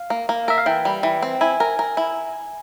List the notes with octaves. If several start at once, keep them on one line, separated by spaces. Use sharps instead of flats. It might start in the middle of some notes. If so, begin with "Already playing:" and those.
Already playing: F5
A#3
A#3
A#4 E5
F5
E3 G5
G3
E3
C4
E4 G#5
A#4
A#4
E4